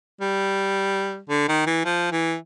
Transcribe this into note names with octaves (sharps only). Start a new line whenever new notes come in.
G3
D3
D#3
E3
F3
E3